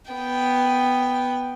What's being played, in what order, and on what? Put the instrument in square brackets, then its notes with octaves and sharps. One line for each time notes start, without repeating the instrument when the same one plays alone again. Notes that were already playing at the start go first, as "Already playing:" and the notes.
[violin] B3 G5